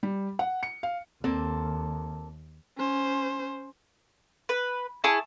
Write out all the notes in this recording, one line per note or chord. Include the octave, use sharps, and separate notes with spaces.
G3
F#5
C#7
F5
D#2 A#3 C4 A4
C#4 C5
B4
E4 G#4 A5 C#6